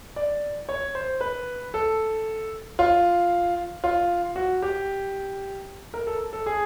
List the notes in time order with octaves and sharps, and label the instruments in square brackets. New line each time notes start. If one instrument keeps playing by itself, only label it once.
[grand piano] D5
C#5
C5
B4
A4
F4
F4
F#4
G4
A#4
A4
A4
G#4